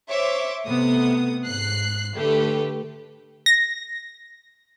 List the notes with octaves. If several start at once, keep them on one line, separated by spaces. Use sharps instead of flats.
C5 C#5 E5 D6
C3 A3 B3 D#6
G#2 F#6 C7
D3 A3 G4 B4
A#6